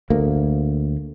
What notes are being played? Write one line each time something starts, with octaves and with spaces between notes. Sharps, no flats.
D2 A#3